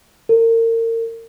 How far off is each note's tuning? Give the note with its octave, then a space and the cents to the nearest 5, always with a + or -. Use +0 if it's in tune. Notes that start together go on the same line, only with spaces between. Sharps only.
A#4 -35